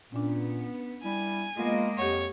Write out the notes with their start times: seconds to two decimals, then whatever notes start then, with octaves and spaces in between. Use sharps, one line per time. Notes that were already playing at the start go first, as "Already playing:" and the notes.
0.12 A#2 B3 C#4 D4
1.04 G3 E4 G#5
1.57 G#3 A#3 B3 F4 D#5
1.98 F2 G4 C#5 F#5